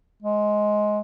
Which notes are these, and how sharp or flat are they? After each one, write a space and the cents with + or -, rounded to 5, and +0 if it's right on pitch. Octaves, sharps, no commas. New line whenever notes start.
G#3 +15